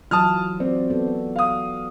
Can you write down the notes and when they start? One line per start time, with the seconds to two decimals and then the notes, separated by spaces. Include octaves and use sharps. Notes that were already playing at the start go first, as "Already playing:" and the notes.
0.11 E3 F#3 F4 A5 D#6 F6
0.60 C4 F#4 D5
0.90 B3 F#4 A4
1.36 F5 D#6